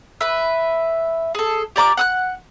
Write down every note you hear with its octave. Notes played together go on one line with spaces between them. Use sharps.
B4 E5
G#4 A4
G4 D5 A#5 D6
F#5 D#6 F#6